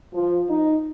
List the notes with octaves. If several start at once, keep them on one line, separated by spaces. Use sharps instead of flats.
F3
D#4